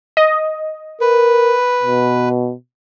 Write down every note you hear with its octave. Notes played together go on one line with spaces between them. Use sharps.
D#5
A#4 B4
B2